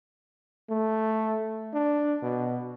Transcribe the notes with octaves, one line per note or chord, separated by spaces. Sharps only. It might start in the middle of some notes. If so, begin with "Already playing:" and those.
A3
D4
B2